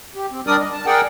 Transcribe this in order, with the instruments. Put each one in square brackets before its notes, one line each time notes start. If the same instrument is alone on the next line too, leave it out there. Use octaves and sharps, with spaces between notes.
[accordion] G4
C4
G3 D4 A#4 D5 D#6
D#5
A5
G#4 A#4 D5 F#5 G5